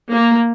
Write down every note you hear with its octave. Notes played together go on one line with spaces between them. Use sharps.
A#3